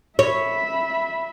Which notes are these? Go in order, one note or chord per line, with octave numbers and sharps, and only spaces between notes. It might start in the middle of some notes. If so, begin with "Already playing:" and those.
C#5 E5 B5